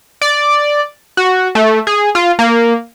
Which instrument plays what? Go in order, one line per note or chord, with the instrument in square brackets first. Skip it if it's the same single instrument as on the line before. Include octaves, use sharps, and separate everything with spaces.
[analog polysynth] D5
F#4
A3
G#4
F4
A#3